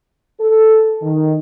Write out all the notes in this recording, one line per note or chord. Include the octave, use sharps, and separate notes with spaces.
A4
D#3